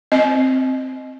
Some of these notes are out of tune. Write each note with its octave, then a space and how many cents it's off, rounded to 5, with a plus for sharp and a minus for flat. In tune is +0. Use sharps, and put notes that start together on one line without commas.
C4 +0 D#5 +0